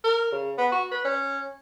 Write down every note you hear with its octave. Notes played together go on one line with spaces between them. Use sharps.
A#4
C#3
B3
F#4
B4
C#4